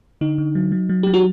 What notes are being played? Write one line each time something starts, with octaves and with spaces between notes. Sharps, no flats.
D3 D#4
D3
F#3
F#3
F#3
F#3 G4
F#4